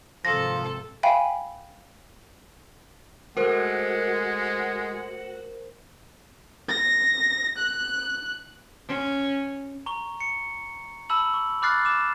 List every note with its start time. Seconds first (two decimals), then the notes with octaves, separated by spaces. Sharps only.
0.25 G#1 C3 F3 A4 A#6
1.03 E5 F5 G5 G#5 B5
3.37 G#3 A3 F#4 A#4 C5 F#5
6.68 A#6
7.58 F#6
8.88 C#4
9.86 A#5 C#6 G7
10.20 C#7
11.10 A5 B5 E6 F#7
11.34 C#6
11.62 B5 D6 F6 F#6 A6 C7
11.85 D6 E7